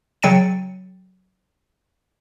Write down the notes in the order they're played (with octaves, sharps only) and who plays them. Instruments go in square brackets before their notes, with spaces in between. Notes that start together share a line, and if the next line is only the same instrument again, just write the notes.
[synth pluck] C#3 F#3 G5 A6 C#7 D#7